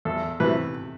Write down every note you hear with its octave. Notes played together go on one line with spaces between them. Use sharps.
E2 A4
C3 E3 A3 B4